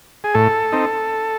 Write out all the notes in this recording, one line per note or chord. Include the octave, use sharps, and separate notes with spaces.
G#4
A2 A4
C4 D#4